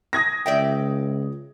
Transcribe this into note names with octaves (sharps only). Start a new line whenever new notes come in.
D#6 G#6 A#6
C#2 D5 E5 G5